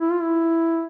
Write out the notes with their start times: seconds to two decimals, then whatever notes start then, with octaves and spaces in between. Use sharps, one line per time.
0.01 E4
0.12 F4
0.22 E4